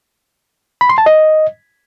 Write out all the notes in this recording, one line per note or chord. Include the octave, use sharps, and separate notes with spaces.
B5
C6
A5
D#5